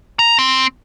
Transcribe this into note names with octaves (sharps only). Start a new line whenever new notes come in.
A#5
C4